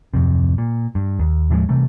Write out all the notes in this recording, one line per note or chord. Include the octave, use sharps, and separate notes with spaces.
D1 G1 F2 C3
A#2
G2
D#2
D#2 A2 F3 G#3
C3 E3 G3 A3